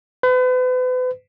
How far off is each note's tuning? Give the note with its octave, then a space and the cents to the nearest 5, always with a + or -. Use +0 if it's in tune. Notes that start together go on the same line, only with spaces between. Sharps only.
B4 +40